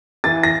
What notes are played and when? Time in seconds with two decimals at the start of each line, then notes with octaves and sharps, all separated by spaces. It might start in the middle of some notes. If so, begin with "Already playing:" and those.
0.24 E3 A6
0.43 A#6